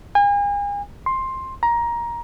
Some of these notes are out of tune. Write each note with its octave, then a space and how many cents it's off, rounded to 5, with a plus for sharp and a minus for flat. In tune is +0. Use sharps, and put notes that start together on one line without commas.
G#5 -40
C6 +10
A#5 +15